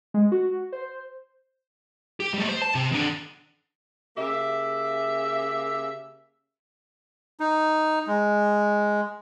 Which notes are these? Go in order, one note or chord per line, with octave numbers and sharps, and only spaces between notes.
G#3
F#4
C5
G4
G3 A3
C5
A5
C3
D#3 D4
C#3 A#3 G4 E5
D#4
G#3